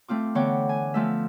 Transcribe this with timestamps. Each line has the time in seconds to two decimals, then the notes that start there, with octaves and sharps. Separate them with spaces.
0.09 A3 C4 F4 D6
0.35 D3 E3 B3 C#5 G5 D6
0.69 G#5
0.94 F3 A3 E5